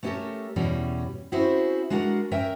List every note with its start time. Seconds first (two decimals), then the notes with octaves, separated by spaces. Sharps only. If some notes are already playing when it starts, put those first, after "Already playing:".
0.03 A3 B3 C#4 G4 A4 A#4
0.56 E2 B2 G3 C#4
1.32 C4 C#4 E4 F#4 G#4 C5
1.90 G#3 D4 F#4 A#4 F#5
2.31 C#4 A#4 E5 G5